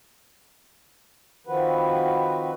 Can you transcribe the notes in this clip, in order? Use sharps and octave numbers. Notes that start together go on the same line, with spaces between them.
D#3 F3 C4 F#4 B4